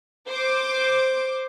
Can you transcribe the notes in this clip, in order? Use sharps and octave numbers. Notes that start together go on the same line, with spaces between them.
C5 D6